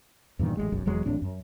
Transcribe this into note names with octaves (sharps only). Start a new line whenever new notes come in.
E2 G2 A#2 D#3
A1 G#3
F#1 B1 F#2
F1 E2 F#3 G#3
A1 A2 C4 D4
F#2